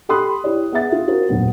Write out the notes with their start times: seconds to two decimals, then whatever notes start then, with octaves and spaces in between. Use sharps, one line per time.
0.09 G4 A4 B5 C6 D#6 F#6
0.44 E4 G4 C#5 D5
0.72 B3 G#4 E5 A6
0.92 F4
1.07 C#4 F4 F#4 A#4 C5
1.29 D#1 F#2 F#3 B3